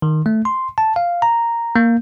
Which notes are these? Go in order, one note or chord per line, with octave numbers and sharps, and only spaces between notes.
D#3
A3
C6
A5
F5
A#5
A#3